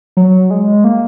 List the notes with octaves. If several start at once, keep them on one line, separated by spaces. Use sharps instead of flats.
F#3
G#3
A#3